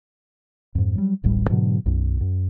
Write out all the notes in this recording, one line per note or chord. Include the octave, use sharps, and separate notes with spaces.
F2 G#2
F#3 G3
D1 A1 A2 G3
G#2 B2 D3 F#3
B1 F#2
F#2